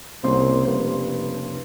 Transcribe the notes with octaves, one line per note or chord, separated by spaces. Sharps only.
C2 C#3 A#3 C5 C6
F1 G2